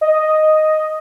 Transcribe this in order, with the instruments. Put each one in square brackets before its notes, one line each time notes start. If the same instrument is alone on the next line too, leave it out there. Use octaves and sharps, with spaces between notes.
[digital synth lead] D#5